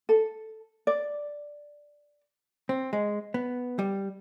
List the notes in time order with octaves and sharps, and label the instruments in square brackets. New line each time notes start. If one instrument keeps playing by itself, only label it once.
[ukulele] A4
D5
[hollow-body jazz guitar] C4
G#3
B3
G3